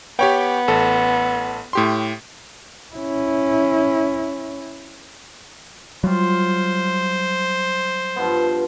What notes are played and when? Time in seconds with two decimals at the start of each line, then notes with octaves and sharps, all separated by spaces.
0.19 B3 G4 C#5 G5
0.68 A1 A4
1.73 A2 G4 C6
2.95 C#4 E4
6.04 F#3 G3 F4 C5
8.16 G2 F3 B3